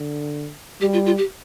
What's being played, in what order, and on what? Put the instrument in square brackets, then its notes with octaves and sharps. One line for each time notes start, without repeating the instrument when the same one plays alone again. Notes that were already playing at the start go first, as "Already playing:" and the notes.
Already playing: [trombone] D3
[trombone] G3 [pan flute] G4
[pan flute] F4
F4
G4